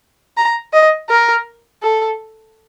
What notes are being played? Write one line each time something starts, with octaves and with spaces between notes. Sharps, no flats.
A#5
D#5
A#4
A4